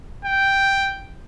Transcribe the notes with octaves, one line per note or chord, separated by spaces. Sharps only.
G5